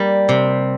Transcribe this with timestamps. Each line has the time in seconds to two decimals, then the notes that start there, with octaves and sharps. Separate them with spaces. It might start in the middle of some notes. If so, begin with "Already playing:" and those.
Already playing: G3 A#3
0.29 C3